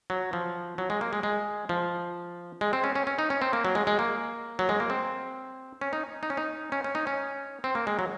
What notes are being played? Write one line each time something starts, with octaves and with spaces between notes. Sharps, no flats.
F#3
F3
F#3
G#3
A#3
G#3
G#3
F3
G#3
C4
C#4
C#4
C#4
D#4
C#4
C4
A#3
F#3
G#3
G#3
A#3
F#3
G#3
A#3
C4
C#4
D#4
D#4
C#4
D#4
C#4
C#4
D#4
C#4
C4
A#3
G#3
F#3